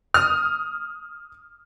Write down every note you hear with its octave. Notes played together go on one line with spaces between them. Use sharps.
D#6 F6